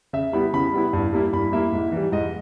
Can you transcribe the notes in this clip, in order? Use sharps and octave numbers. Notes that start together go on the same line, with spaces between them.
C#3 E5
G3 B3 E4 B5
C#3 B5
G3 B3 E4
G2
G3 A#3 E4
G2 B5
G3 A#3 E4 E5
G#2
E3 G3
G#2 D#5